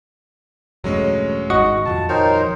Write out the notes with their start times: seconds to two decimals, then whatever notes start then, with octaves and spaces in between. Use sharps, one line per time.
0.84 E1 G2 F#3 G#3 A3 C#4
1.50 G#1 G#2 F#4 D#5 C#7
1.85 D#1 F2 F3 A5
2.09 D#4 A#4 C5 C#5 G5